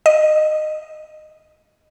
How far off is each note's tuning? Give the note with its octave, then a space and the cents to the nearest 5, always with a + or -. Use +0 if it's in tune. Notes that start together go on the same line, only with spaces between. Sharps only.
D#5 -15